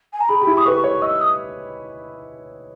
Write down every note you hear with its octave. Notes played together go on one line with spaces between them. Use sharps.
G#5
A#5
G#4 B5
G4
E4
D#6
B4 C#6
C#5
D#5 E6
D#6